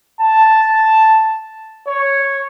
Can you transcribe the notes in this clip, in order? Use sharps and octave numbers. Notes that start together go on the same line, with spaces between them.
A5
C#5